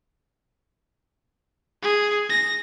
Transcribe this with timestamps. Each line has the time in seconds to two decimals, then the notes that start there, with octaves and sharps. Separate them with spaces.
1.82 G#4
2.30 A#6